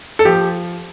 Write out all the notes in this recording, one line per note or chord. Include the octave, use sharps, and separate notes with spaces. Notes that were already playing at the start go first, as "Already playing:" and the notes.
A4
F3 G4